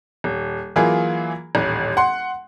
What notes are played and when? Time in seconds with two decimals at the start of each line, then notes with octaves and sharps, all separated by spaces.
0.24 D#1
0.76 E3 F#3 A#3 F4 G#4
1.55 D#1 A1
1.97 F#5 C6